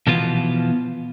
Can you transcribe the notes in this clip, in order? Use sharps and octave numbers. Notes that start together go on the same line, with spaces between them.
B2 E3 F3 B3 F4